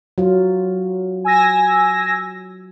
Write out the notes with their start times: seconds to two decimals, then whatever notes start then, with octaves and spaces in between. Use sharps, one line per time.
0.18 F#3 F4
1.24 G#5 E6 A#6